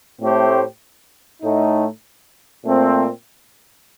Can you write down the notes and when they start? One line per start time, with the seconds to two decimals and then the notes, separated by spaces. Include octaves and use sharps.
0.20 A2 A3 C4 G4 C5
1.42 A2 A3 D#4
2.64 A#2 A3 C4